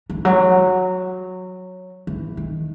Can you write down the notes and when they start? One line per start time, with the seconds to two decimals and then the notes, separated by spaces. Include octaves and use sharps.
0.10 E3
0.25 F#3
2.07 E3
2.37 D#3